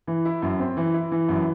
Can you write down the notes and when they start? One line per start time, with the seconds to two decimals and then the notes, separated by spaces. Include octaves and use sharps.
0.07 E3
0.25 E4
0.42 F#2
0.60 C4
0.77 E3
0.94 E4
1.11 E3
1.29 F#2